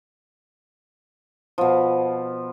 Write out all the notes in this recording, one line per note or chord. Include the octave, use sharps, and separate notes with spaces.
B2 F3